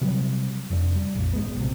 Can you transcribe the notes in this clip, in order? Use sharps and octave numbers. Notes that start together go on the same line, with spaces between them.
C3 F#3 G3
F1 F2 C4 D4
G3
A#1 F2
G#1 G#3 B3
A#1 C3